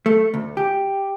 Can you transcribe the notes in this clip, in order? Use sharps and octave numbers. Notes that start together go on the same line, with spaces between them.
A3
D2
G4